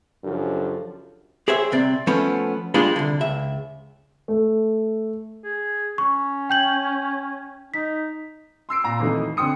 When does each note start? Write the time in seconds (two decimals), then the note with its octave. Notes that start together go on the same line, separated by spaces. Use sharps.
0.25 F#2 C#3 F3 D4 G4 A4
1.48 G4 G#4 C5 C#5 E5
1.72 C2 C3 C4 D5
2.07 F3 A3 B3 C#4
2.74 G3 G#3 A#3 D4 F4 G#4
2.96 C2 D3
3.21 C#2 E5
4.28 A3
5.44 G#4
5.98 C#4 C#6
6.50 G5 G6 F#7
7.74 D#4 B6
8.69 C6 E6 C7 D7
8.84 A#2 A#5
8.99 F2 D#3 E3 F#3 A3 D#4
9.37 F2 D3 G5 C6 D#6 C#7